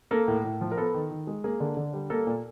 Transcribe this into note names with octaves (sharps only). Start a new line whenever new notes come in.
A#3 A4
A2
A2
F3
A#4
B3 A4
D#3
D#3
G#3
A#3 G#4
D3
D3
G3
A#3 A4
A#2